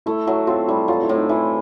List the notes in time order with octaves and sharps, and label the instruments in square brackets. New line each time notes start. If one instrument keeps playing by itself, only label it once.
[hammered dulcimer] A3 [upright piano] E4
[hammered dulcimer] F#3 [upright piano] E4
[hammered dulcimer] C4 [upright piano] F4
[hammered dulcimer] G3 [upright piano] E4
[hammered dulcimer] F#3 [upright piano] F4
[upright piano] E4
[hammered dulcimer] A2
[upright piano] D#4
[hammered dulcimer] E3 [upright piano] E4